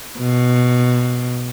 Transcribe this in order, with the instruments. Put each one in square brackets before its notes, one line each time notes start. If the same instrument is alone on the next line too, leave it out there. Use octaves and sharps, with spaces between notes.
[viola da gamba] B2